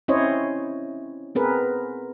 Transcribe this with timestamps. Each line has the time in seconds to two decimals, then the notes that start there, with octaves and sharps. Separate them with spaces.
0.08 C4 C#4 E4 C5 C#5 D#5
1.35 B3 C4 G#4 A#4 B4